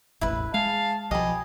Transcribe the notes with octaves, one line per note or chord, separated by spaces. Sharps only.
E1 A1 E4 B4
G#3 G#4 F5 A5
B1 F3 G4 D#5 G#5 B5